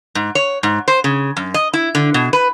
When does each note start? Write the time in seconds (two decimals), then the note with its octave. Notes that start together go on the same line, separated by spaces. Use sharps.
0.15 G#2
0.35 C#5
0.63 G#2
0.88 C5
1.04 C#3
1.37 F#2
1.54 D#5
1.73 E4
1.95 D3
2.14 B2
2.33 B4